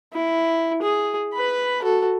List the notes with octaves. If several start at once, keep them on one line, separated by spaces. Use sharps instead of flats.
E4
G#4
B4 B5
F#4 A4